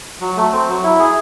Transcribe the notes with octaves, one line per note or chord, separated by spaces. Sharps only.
F#3
A3
C4
F#3
E4
G#4